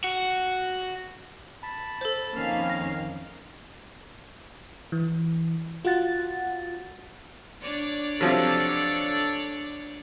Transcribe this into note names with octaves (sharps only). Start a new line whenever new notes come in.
F#4
A5 B5
A4 C5
F2 D#3 A#3 C#4 F5
A#6
E3
F4 F#4 F#5 A6
D4 C#5 D5
C3 F3 F#3 A4